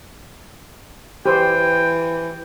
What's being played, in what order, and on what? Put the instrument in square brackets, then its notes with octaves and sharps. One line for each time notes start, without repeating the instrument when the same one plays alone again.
[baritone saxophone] E3 [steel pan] G4 C5 [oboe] G5